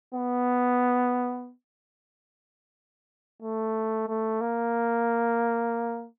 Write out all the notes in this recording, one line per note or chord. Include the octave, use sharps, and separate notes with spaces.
B3
A3
A3
A#3